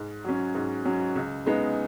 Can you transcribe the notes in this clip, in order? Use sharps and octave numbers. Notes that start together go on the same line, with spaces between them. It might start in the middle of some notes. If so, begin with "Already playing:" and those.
Already playing: G#2
F#3 C#4
G#2
F#3 C#4
C#2
C#3 G#3 B3 D#4